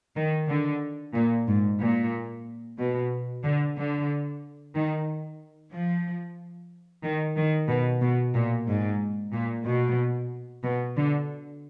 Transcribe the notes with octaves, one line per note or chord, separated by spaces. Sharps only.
D#3
D3
A#2
G#2
A#2
B2
D3
D3
D#3
F3
D#3
D#3
B2
B2
A#2
G#2
A#2
B2
B2
D3